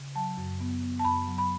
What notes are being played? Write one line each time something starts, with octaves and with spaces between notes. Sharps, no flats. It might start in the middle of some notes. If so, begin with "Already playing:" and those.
Already playing: C#3
F#3 A5
F#2
B3
B3
A5
F#2 B5
F#3
B5